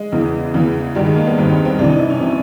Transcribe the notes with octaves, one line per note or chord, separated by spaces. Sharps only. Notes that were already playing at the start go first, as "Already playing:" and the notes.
Already playing: G#3
E2 C#3 E3
E2 C#3 E3
G2 D#3 G3
G#3
A#3
B3
G2 D#3 C4
C4
C4
C2 C3 E3 D4
D#4
E4
C#4
C3 E3 C4